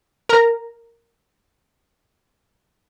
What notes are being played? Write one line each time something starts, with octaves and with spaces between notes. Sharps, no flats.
A#4 A#5